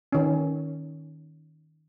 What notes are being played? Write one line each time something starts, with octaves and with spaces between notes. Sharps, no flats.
D#3 C#4